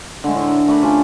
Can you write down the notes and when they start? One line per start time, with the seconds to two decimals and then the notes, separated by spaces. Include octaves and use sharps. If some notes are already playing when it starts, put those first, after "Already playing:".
0.24 D3 G#3 A3
0.35 A2
0.47 A#4
0.68 A3 D4 B5
0.83 C#4 D4 F4 G4